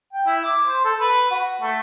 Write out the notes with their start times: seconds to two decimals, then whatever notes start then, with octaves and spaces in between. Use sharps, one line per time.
0.13 G5
0.26 E4
0.44 D6
0.66 C5
0.84 A4
1.01 B4
1.31 F#4
1.61 A3